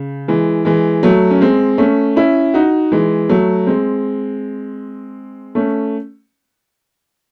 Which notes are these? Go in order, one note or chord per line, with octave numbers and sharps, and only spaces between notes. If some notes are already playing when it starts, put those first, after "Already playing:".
Already playing: C#3
E3 G#3
E3 G#3
F#3 A3
C#4
G#3 C4
A3 C#4
C#4 E4
D#4 F#4
E3 G#3
F#3 A3
G#3 C4
A3 C#4